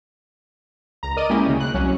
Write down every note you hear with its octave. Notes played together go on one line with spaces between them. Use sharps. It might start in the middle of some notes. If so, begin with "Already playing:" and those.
C#2 A#5
A#4 D5 D#5 D#7
G#3 A#3 C#4 E4 G4
D2 C#3
F#6
C2 F#3 C#4